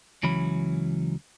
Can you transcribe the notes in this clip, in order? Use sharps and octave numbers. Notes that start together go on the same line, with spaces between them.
C#2 E3 F#3 C#4 B5